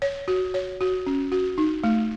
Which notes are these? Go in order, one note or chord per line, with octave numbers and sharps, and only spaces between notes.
C#5
F#4
C#5
F#4
C#4
F#4
D#4
A3